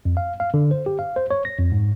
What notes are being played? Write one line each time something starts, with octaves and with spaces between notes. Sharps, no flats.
F2
F5
F5
D3
C5
G4
F5
C5
C#5
A#6
F2
G#2